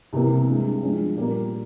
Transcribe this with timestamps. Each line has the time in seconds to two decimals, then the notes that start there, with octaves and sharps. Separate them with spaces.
0.13 C2 C3 E3 A#3
0.47 G2 E3 G#3
0.82 G2 F3 G#3 C#4
1.17 A#2 G3 A#3